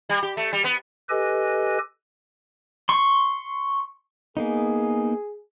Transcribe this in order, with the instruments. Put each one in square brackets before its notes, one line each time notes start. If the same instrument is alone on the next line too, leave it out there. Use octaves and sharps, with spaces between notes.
[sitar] G3
G4
A3
G3
B3
[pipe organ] G4 A4 B4 D#5 G#5
[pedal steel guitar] C6 C#6
[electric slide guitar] A#3 B3 D#4 [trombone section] G#4